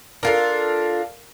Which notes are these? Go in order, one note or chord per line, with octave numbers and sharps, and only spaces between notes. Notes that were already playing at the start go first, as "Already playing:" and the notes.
D4 F4 A4 A#4 F5